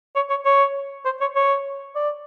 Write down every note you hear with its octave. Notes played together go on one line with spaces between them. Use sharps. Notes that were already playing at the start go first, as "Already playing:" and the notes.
C#5
C#5
C#5
C5
C#5
C#5
D5